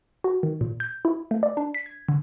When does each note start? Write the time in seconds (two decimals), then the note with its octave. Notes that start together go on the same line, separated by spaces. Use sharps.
0.24 F#4
0.43 D#3
0.61 A#2
0.80 G6
1.05 E4
1.31 A3
1.43 D5
1.57 D4
1.74 B6
1.86 G#6
2.09 D3